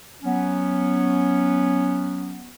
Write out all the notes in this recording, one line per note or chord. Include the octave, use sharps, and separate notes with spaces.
F#3 B3 C#4